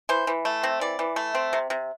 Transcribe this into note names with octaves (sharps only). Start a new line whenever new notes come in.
E3 C5
E3
A3
C4
E3 D5
E3
A3
C4
C3
C3